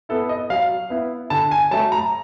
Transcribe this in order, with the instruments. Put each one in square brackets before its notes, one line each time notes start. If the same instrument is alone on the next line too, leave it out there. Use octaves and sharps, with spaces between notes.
[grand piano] B3 E4 A4
D#5
F#3 F5
B3 E4
D3 A5
G#5
F#3 A3 A5
A#5